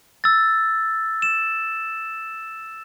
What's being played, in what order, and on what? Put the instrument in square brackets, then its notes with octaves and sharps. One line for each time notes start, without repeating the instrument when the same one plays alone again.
[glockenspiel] E6 A6
E7